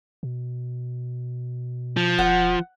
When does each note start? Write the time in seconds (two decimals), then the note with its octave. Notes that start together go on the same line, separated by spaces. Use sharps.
0.23 B2
1.97 F3
2.19 E1 F#5